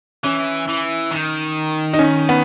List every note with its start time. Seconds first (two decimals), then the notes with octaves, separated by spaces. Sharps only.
0.24 E3 C#4
0.68 E3
1.11 D#3
1.93 D#4
1.99 C#4
2.29 B3